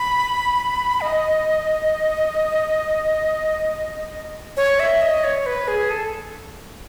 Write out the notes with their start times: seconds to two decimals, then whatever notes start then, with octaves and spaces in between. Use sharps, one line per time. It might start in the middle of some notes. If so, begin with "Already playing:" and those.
Already playing: B5
1.01 D#5
4.57 C#5
4.80 E5
5.01 D#5
5.24 C#5
5.46 B4
5.68 G#4
5.90 A4